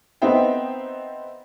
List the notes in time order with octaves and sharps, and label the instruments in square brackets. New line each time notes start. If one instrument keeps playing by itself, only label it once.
[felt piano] B3 C4 D#4 C5 E5 G5